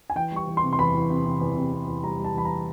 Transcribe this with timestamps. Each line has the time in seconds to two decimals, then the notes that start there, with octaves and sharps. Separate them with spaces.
0.10 G#5
0.15 E3 G5
0.32 G3 C#6
0.47 E3
0.57 C6
0.63 C3
0.73 C6
0.79 E2 B5
0.95 E3
1.10 C3
1.25 C3
1.41 E2
1.56 C3
1.73 C3
1.88 E2
2.04 G3 A#5
2.19 G3
2.25 A5
2.35 E3 B5
2.45 A#5